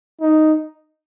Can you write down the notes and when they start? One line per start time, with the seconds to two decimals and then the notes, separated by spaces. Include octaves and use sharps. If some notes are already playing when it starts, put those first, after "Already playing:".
0.21 D#4